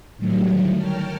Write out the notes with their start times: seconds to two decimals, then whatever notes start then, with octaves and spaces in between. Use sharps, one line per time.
0.17 A2 D3 D#3 F#3 G3 A3
0.75 A#4 C#5 G5 A5 F6